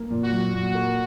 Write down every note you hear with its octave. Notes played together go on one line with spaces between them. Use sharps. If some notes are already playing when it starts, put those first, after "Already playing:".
Already playing: A#3
A#2
F#4
F#3
A#2 F#4
A#3